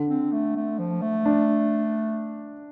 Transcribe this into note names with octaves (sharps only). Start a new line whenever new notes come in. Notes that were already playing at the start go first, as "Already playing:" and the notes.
Already playing: D3
C4
A3
A3
F3
A3
D4